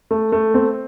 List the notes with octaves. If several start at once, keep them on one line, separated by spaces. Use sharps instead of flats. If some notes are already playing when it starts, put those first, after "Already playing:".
A3
A3
C4